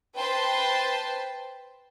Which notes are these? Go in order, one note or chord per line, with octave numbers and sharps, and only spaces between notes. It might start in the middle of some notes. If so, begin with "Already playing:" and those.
B4 C5 G5 A5 C6